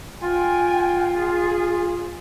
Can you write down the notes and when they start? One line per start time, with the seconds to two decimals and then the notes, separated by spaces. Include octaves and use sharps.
0.22 F4 G5 G#5
1.17 G#4